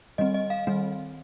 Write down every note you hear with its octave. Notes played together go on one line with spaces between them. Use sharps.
D#3 G3 C4 D#5
D#5
F5
D#3 G3 C4